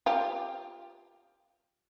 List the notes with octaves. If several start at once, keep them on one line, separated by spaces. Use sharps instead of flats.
F4 G4